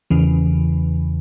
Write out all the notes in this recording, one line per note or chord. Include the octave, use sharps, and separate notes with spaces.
E2 C#3 E3